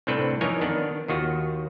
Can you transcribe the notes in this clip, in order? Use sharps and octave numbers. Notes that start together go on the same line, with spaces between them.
C2 A2 C4 D4 A4 B4
F2 E3 D#4 A#4 C#5 G#5
D#3 B3 D4
D#2 D#3 F4 F#4